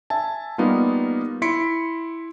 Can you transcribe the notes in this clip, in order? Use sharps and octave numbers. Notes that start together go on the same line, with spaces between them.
E5 G#5 A5
G3 A#3 B3 D#4 F4
E4 C6 B6 C#7 D7